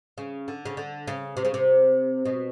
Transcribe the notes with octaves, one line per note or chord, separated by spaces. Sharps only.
C#3
D3
C#3
D3
C#3
C3
C#3
C3
B2